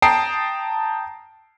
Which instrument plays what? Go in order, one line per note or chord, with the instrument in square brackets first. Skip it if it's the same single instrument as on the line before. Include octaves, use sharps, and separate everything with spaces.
[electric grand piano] G5 A5 A#5 D#6 C7 D7